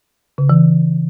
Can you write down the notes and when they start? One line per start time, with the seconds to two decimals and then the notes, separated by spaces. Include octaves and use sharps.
0.38 C#3
0.50 E3